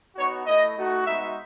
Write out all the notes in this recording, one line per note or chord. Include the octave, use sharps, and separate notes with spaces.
B3 D#4 F#4 C#5
A3 E4 D#5
A3 D#4 F#4
G#3 B3 D#4 F#4 E5